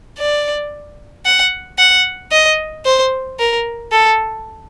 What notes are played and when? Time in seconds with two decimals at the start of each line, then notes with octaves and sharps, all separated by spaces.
0.19 D5
1.26 F#5
1.78 F#5
2.32 D#5
2.86 C5
3.39 A#4
3.92 A4